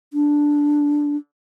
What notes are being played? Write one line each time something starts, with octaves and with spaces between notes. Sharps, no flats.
D4